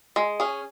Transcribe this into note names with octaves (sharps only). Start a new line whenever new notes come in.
G#3
C#4 G#4